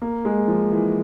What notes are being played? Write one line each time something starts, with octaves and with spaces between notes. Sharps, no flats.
A#3
G#3
F3
E3